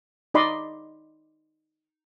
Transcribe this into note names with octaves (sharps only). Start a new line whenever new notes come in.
D#4 D5 D#5 B5 C6 D6